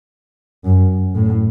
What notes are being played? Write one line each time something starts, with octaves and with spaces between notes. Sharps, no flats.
F#2
A2